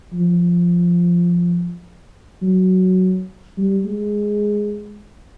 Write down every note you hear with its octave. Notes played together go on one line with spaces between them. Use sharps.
F3
F#3
G3
G#3